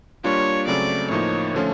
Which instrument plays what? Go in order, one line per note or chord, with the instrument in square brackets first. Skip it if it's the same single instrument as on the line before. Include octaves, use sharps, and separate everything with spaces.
[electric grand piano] G3 A#3 D4 F4 [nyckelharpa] C#5
[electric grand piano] C#3 F#3 A3 C4 [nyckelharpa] D5
[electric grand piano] A2 F3 A#3 D#4 [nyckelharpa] C#5
[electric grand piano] D3 F3 A3 C#4 F4